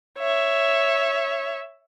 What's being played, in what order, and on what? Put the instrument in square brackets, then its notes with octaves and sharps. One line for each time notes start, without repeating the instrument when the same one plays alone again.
[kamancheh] C#5 E5